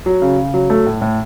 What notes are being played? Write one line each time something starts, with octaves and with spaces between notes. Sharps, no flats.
F#3
C#3
C#3
F#3
A3
A2
A2